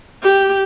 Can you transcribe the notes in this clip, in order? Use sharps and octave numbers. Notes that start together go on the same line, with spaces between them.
G4